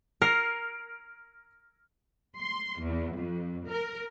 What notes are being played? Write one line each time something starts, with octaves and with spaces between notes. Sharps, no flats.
A#4 F6 A#6 C7
C6
E2
F2
A#4